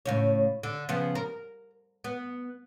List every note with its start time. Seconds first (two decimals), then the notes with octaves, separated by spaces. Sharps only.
0.06 A2 C#3 C#5
0.63 D3
0.89 C#3 F3 B3
1.15 A#4
2.04 B3